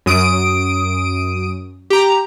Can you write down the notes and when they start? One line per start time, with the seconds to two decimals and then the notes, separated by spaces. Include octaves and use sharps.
0.06 F#2 D#6 D7
1.90 G4 A#5